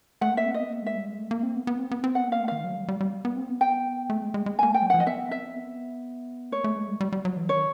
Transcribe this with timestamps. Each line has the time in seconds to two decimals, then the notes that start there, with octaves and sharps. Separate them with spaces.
0.21 A3 F#5
0.34 A#3 E5
0.46 C4
0.54 B3 D#5
0.70 A#3
0.82 G#3 E5
0.94 G3
1.06 G#3
1.19 A3
1.31 A#3
1.43 C4
1.55 B3
1.67 B3
1.79 C4
1.91 B3
2.04 C4
2.15 B3 F#5
2.28 A#3 F5
2.40 A3
2.48 D#3 F5
2.64 F#3
2.76 G3
2.88 G3
3.01 G3
3.25 B3
3.37 C4
3.49 B3
3.61 G5
4.10 A3
4.22 G#3
4.34 G#3
4.46 G#3
4.59 A#3 G#5
4.70 A3 G5
4.82 F#3
4.90 F3 F#5
5.00 D#5
5.07 B3 E5
5.31 C4 E5
5.55 B3
6.52 A3 C#5
6.64 A3
6.76 G#3
6.88 G3
7.01 G3
7.12 G3
7.25 F#3
7.37 E3
7.49 D#3 C#5